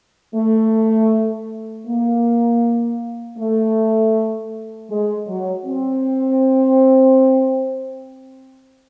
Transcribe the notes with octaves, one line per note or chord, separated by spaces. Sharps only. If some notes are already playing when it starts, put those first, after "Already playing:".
A3
A#3
A3
G#3
F#3
C4